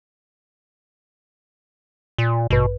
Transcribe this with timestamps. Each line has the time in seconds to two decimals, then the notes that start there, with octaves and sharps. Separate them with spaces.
2.18 A#2
2.50 A1 G2 B2 B4